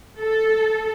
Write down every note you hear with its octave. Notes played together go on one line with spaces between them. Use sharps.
A4